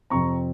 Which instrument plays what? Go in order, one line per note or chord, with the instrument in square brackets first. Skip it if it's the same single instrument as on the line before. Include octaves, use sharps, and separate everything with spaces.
[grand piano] F2 C3 F3 C4 A#5 C#6